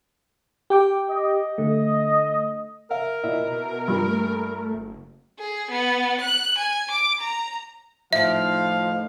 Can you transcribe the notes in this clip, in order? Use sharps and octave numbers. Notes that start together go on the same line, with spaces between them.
G4 G5 D6
D#5
D3 A3
A#4 E5 F5
A#2 E4 D#5 E5
B2
G2 A#2
A3
F#1
G#4
B3
F#6
G#5
D6
A#5
D#2 A2 D#3 F3 E5 F5